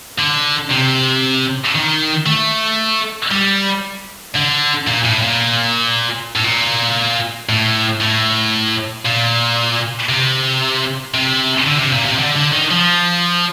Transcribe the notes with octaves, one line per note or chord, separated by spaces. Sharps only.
D3
C3
D#3
A3
G3
D3
A#2
A2
A#2
A2
A#2
A2
A2
A#2
C3
C3
D3
C3
A#2
C3
D3
D3
D#3
F3